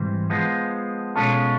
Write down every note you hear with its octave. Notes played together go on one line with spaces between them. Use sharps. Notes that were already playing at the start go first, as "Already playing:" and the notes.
Already playing: G#2 E3 G3 C4
F3 G#3 B3
B2 G#3 C#4 F4 A4